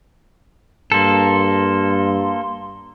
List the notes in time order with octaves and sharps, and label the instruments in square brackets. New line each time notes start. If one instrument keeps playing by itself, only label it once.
[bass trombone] G2 [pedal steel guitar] A#3 A4 [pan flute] C6